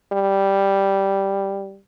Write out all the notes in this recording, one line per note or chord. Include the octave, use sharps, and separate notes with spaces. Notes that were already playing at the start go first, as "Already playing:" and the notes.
G3